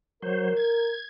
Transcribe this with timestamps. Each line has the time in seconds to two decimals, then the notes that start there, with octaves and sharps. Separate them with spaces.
0.23 F#3 A#4 C5
0.57 G#6